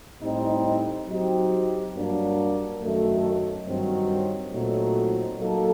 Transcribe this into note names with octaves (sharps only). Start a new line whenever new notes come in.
A2 G3 C4 D#4
F#3 C4 D#4 G4
G2 F#3 A#3 D4
F#2 D#3 A3
G2 D#3 F#3 C4
A#2 F#3 A3 C4 D#4
F#3 A#3 D#4 A4